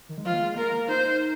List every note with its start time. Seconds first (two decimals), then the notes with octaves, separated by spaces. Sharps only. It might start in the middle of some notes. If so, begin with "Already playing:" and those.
0.09 D#3
0.18 G#3
0.25 F3 F4
0.34 A#3
0.41 G#3
0.56 A#3 A#4
0.73 A#3
0.89 D#4 C5